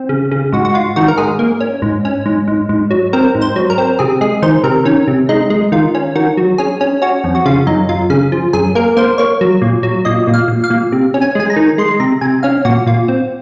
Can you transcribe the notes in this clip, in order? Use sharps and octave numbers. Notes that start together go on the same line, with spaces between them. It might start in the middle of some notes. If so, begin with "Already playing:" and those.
Already playing: C4
C#3
C#3
G#2 F#4
F#4
G#2 F4
D#3 F#4
A#4
G#2 G#4
A#3
C#4
G#2
C#4
G#2
G#2
G#2
F#3
C4 A#4
G#2
C5
F#3
A#4
C4
C3 G#4
G#3 G#4
D#3 C5
C3 A#4
D#3 C#4
C3
G#3 D#4
G#3
D#3 F4
C#4
D#3 F#4
F#3
C#4 G#4
C#4
C#4 F#4
F2
F#4
C#3 F4
F#2 D#4
F#2 F4
C#3 G#4
F3
F#2 G#4
A#3 A#4
A#3 C5
A#3 C#5
F#3
A#2
F#3
A#2 D#5
A#2
F5
A#2
F5
A#2
C3
C#4
G#5
G#3 G#5
A#5
D#3
G#3 C6
C3 A#5
C3 G#5
C#4 F5
A#2 F#4
A#2 F4
C4